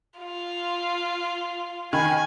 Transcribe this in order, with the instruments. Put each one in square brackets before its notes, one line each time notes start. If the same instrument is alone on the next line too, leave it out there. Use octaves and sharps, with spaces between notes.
[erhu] F4
[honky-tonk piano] D#3 B5 [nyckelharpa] G#5